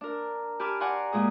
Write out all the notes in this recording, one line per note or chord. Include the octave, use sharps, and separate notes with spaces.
D4 A#4
G4 G#5 A5 B5 D6 F6
D5 F#5 G#5 A#5 C6
A#2 G#3 G#4 D#6